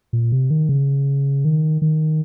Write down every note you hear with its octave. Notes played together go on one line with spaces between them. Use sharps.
A#2
C3
D#3
C#3
D#3
D#3